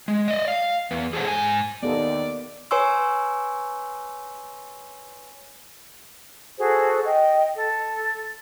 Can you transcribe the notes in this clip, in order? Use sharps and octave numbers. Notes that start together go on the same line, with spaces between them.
G#3
D5 D#5
F5
E2 B3
G#4 A4 B4 C5 F#5
G#2 G#5
D#2 B3 A4 D5
B4 C#5 G#5 C6 C#6 E6
F#4 G#4 A4 C5
D#5 G5
A4